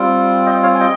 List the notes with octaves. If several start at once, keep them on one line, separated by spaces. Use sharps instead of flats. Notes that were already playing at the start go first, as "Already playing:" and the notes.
Already playing: G3 C4 F4
D#5 G5
C#5 F5
G#5
D#5 G5